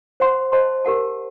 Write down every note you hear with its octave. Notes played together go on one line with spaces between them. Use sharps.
C5 F#5 C6
C5 D#5 A5 C6
G4 A#4 F#5 A5